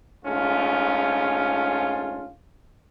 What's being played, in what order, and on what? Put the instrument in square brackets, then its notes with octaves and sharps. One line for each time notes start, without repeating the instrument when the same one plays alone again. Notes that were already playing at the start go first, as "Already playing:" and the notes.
[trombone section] A#1 G#2 A3 C#4 F4